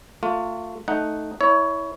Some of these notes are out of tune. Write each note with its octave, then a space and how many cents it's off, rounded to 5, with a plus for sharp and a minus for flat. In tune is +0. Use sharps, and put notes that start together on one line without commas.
A3 +35 F4 +20
A3 +0 D#4 +0 F#5 +0
E4 -20 C#5 +20